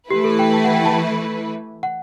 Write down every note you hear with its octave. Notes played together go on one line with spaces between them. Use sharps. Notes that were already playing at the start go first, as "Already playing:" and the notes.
E3 A3 E4 G4 B4
A4
G5
A5
F#5
G5
A5
F#5